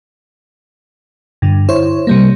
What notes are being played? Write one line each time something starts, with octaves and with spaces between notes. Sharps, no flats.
G2 D3
E4 C5 C#5
C3 G3 A#3